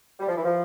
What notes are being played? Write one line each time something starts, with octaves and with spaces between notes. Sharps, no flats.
G3
F3
E3
F3